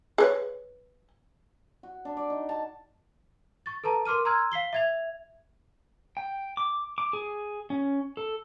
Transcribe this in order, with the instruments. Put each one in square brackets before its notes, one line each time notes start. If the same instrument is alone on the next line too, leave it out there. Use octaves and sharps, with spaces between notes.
[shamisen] G#4 B4 C#5
[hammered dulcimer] F#4
D4
D5
D#4
A5
[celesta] C#6 A6
A4 B4 A5 A#5
A#4 C6 D6 F6 D#7
A#5 C6 E6 F6 G#6
F5 B6 C7 G7
E5 G#6 F7
[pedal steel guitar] G5
D6
D6
G#4
C#4
A4